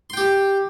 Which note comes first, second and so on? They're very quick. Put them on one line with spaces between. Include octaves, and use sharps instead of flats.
C6 G5 G4